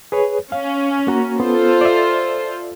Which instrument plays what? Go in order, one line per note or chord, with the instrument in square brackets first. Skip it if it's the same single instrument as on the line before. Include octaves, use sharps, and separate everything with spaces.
[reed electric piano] G#4 B4 C#5
[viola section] C#4 [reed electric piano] F5
[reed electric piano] A#3 F#4 A#5
[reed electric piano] B3 [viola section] F4 A4 C5
[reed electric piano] D5 E5